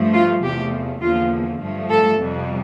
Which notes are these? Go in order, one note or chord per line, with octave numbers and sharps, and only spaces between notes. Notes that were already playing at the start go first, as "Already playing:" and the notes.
Already playing: G2 F3 A3
F4
E2 C3 F3 A3 G4
E2 D3 F3 A#3 F4
G2 F3 A3
A4
F2 C3 G3